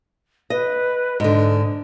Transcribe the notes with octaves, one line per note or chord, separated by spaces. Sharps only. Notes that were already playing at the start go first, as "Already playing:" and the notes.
B4 D#5
G#2 D3 D#5